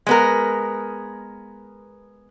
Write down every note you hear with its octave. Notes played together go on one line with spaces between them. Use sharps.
G#3 B3 A#4